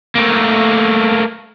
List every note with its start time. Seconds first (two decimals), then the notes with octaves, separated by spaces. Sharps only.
0.15 A3 A#3